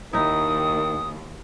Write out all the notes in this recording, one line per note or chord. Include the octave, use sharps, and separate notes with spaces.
D#2 D#3 D#4 E4 D#6